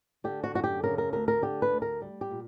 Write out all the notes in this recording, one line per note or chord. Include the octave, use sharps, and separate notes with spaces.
D3 G4
F#4
F#2 F#4
G4
C#3 A#4
A#4
D2 A#4
A#4
D3 G4
B4
D2
A#4
G3
G4
A#2